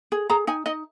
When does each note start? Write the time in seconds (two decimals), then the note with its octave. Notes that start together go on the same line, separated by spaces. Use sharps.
0.12 G#4
0.30 G#4 A#5
0.47 D#4 G#5
0.66 D#4 D#5